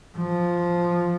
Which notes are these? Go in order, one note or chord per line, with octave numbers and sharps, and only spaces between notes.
F3